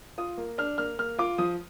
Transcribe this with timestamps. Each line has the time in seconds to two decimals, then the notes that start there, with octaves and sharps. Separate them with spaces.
0.18 F4 D#6
0.37 A#3
0.58 D4 F6
0.78 A#3 F6
0.99 A#3 F6
1.19 F4 D6
1.38 F3 D#6